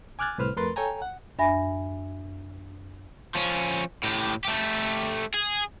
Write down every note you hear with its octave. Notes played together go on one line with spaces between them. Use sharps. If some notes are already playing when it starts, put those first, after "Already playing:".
G#5 D6 F6 F#6 G#6 A6
C2 A2 B4 C5 F6
F2 A3 A#4 B4 C6 A6
A4 C#5 G5 G#5 A#5
F#5
F#2 D4 E5 G#5 B5 A#6
F3 C#4
A2 G4
A3 G4
G#4